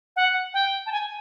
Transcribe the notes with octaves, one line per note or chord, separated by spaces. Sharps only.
F#5
G5
A5
G#5